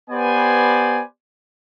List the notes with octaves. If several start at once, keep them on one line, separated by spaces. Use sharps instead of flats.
B3 G4 B4 C5 D5 G#5